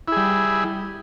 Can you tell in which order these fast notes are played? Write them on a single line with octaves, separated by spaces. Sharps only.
E4 G#4 G3